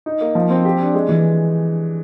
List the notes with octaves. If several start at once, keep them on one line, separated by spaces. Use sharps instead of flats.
D#4
A#3
F3
C4
G4
D4
G#3
E3